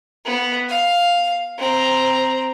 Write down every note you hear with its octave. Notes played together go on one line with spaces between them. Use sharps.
B3
F5
C4 A#5